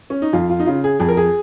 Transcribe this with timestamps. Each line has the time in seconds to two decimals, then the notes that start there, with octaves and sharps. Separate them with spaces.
0.10 C#4
0.22 D#4
0.33 F2 F4
0.50 F4
0.60 D#4
0.66 C#3 F4
0.84 G#4
1.00 F2 G#4
1.08 A#4
1.17 G#4